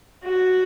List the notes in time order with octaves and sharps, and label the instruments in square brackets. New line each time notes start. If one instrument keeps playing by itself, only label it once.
[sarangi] F#4